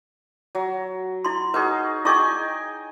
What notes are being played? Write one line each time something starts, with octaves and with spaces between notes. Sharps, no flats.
F#3
E4 C6
D#4 F#4 G#4 B4
E4 G#4 D#5 G5 G#5 C#6